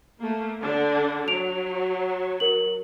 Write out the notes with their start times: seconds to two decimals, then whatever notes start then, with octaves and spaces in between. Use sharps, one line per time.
0.20 A3 A#3
0.61 D3 D4
1.28 F#3 D7 F7
2.40 A#4 F#7